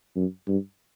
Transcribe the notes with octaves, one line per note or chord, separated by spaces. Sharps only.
F#2
G2